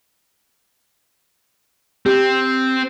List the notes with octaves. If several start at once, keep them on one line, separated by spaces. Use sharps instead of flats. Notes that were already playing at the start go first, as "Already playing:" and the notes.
C4 G4